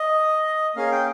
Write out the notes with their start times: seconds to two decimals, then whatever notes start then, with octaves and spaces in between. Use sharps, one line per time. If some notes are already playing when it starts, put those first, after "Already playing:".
Already playing: D#5
0.76 A#3 C#4 G#4 F5
0.92 G5